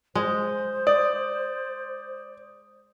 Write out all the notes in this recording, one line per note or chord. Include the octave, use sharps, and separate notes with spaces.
G#3 C5
D5 D#6